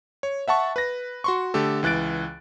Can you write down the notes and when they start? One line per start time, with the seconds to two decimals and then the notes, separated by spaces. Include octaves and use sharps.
0.23 C#5
0.48 E5 F#5 A5 C#6
0.76 B4 A#6
1.24 F#4 C6 C#6
1.54 D3 A3 G4 A4
1.83 C#2 E3 F#6 A6 D7